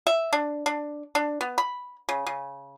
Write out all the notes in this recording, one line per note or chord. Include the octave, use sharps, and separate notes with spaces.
E5
D4
D4
D4
B3
B5
C#3
C#3